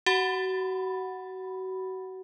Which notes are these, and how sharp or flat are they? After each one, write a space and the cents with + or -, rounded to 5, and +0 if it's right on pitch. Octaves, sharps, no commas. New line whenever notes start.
F#4 +30 F#5 +0 B5 +0